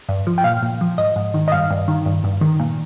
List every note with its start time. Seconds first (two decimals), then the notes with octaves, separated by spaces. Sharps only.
0.09 G2
0.27 F3
0.38 G5
0.44 A#2 F5
0.62 A#2
0.81 F3
0.98 G#2 D#5
1.16 G#2
1.34 D#3
1.48 D#5
1.52 G2 F5
1.71 G2
1.88 D#3
2.06 G2
2.24 G2
2.41 D#3
2.59 A#2